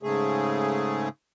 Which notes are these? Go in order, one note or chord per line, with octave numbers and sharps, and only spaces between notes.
G#2 C#3 A3 G#4